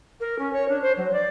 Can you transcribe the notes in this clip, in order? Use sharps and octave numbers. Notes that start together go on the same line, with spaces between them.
A#4
C#4
C#5
D4
C5
F#3
D5